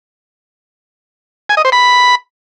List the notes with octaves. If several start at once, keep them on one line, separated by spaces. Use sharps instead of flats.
G#5
D#5
C5
B5